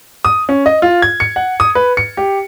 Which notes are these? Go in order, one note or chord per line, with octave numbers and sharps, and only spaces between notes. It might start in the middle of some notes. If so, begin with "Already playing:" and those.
D#6
C#4
D#5
F4
G#6
C#7
F#5
D#6
B4
C#7
G4